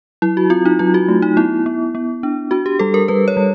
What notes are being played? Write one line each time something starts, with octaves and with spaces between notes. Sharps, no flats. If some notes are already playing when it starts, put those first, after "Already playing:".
F#3 E4
F#4
C4 F4
D#4
F#3 F4
F#4
A3
D#4
B3 E4
B3
B3
D4
D4 F#4
G4
G3 A4
A#4
G3 B4
C#5
G3